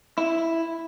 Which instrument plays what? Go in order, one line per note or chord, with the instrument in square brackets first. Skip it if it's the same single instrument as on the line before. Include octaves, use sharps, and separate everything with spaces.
[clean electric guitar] E4